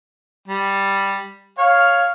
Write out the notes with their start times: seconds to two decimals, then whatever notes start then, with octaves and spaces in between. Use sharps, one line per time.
0.48 G3
1.58 C#5 F5